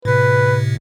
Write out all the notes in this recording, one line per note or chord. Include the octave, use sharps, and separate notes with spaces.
A2 C3 B4